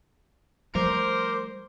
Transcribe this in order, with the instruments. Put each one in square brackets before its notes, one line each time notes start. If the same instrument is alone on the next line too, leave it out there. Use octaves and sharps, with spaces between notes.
[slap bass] F3 G3 A3 [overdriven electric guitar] A#4 [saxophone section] C5 [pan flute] D6